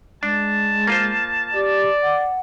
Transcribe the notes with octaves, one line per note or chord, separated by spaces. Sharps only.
G#3 D4 A5
A#3 F4 C5
G4 D5
F#5